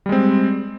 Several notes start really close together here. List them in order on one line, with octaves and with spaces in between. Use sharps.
G3 G#3 C4